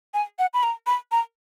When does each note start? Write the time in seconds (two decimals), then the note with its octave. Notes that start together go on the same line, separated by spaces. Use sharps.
0.14 G#5
0.39 F#5
0.54 B5
0.63 A#5
0.87 B5
1.12 A#5